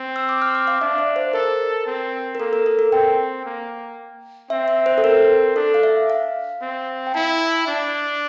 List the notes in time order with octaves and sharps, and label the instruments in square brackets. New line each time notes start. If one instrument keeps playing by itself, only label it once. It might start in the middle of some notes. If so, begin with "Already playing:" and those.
Already playing: [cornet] C4
[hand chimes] E6
D6
F6
D6
F5
[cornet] D4 [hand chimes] E5
[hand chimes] D5
C5
[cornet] A4 [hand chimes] A#4
[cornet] C4
[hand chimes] A#4
[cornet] A#3 [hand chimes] A4
[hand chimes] A#4
A4
A#4
[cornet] C4 [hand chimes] G5
[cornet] A#3
[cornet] C4 [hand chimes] E5
[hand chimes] E5
C5
A4
[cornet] C4 [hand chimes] A#4
[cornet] D4 [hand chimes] A4
[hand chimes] F5
E5
F5
[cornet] C4
[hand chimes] G5
[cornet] E4 [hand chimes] A5
[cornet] D4